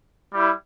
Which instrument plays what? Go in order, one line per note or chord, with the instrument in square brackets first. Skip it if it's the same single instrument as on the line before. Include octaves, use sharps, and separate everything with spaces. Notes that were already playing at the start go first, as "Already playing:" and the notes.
[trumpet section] G3 E4